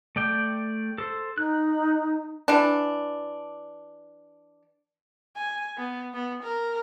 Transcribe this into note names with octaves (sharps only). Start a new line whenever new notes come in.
A3 D5 G5
A4 C5
D#4 F#6
E3 D4
G#5
B3
B3
A#4